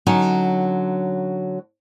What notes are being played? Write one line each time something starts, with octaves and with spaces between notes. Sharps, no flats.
D3 F#3 C#4 D#4